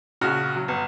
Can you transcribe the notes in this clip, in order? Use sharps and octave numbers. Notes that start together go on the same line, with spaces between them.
A#1 C#3 F#4 F6
F#3
G1